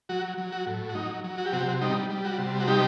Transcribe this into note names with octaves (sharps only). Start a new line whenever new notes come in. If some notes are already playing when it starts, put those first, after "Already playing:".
F#3 F#4
F#3
F#4
A2
F#4
F#3 D#4
F#3
F#4
G4
C3 F#4
G4
F#4
G3 D#4
G3
F#4
C3
F#4
G3 D#4 G4